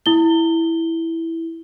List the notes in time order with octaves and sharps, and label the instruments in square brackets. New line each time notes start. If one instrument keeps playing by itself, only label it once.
[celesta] E4 G7